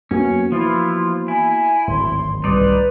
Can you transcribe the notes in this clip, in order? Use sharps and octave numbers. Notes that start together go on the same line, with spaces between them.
F#2 A#3 B3 C#4 F#4
E3 F3 E4 F4
E4 G#5
D1 G#1 C6
C2 G3 D#4 B4 D5 C6